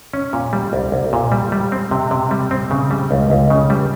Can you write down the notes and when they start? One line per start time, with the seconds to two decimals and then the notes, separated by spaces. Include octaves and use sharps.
0.13 C#4
0.33 A#2
0.53 G3
0.73 C2
0.92 C2
1.13 A#2
1.32 G3
1.52 G3
1.72 C4
1.91 C3
2.11 C3
2.31 G3
2.51 C4
2.71 C#3
2.91 G3
3.11 C#2
3.30 C#2
3.50 C#3
3.70 G3